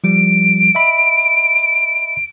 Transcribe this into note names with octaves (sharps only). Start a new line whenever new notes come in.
F3 G3 D7
D#5 E5 B5